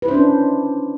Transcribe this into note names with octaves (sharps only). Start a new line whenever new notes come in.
C#4 D4 E4 B4 C5